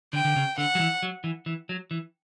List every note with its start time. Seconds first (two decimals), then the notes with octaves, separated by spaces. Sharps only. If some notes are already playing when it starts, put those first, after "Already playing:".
0.13 D3 G5
0.25 D3
0.36 C#3
0.58 D3 F#5
0.75 F#3
0.80 E3
1.03 F#3
1.24 E3
1.46 E3
1.69 F#3
1.91 E3